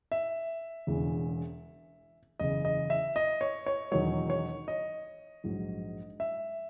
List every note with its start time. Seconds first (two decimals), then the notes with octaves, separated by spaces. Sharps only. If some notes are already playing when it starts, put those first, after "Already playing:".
0.12 E5
0.87 E1 E2 C#3
2.40 F#1 E2 C#3 D#5
2.65 D#5
2.90 E5
3.16 D#5
3.41 C#5
3.66 C#5
3.91 E1 E2 D#3 F#3 C#5
4.30 C#5
4.68 D#5
5.44 A#1 G#2 F#3
6.20 E5